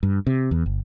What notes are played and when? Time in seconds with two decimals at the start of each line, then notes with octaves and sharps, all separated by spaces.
0.03 G2
0.27 C3
0.51 E2
0.66 G1